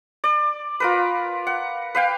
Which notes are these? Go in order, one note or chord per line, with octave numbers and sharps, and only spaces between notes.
D5
F4 A#4 B4
F#5
B4 F5 G5